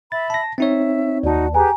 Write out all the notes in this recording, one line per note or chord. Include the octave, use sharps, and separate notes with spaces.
E5 B5 A6
A5 A#6
C4 D#4 C#5 E5
D#2 D#4 F#4 D5 A5
G4 G#4 B4 G#5 A#5